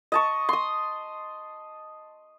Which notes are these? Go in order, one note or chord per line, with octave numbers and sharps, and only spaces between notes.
D#5 A5 C#6
C6 D#6